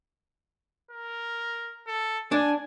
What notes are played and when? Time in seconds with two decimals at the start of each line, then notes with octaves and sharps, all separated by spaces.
0.91 A#4
1.87 A4
2.32 D4 G#5